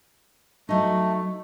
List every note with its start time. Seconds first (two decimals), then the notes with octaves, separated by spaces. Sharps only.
0.69 F#3 A3 D#4